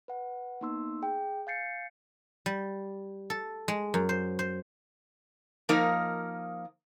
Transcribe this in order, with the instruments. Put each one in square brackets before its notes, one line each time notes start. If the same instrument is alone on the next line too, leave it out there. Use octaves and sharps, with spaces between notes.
[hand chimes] B4 F#5
A#3 B3 D#4 C6 E6
G#4 G5
F5 G#5 G6 A6 C7 C#7
[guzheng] G3
A4
G#3
F#2
C5
C5
[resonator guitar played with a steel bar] F3 A#3 D#4 A#4 D#5